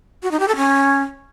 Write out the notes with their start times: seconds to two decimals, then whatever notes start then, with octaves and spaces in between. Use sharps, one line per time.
0.23 F#4
0.31 D#4
0.40 G4
0.48 A4
0.56 C#4